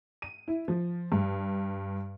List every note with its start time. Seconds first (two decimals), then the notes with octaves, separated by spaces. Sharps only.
0.22 D#7
0.48 E4
0.68 F3
1.12 G2